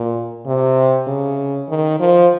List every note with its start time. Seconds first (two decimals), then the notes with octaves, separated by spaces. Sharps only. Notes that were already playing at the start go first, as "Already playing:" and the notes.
Already playing: A#2
0.46 C3
1.07 C#3
1.69 D#3
2.00 F3